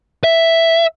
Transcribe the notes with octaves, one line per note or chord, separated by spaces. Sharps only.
E5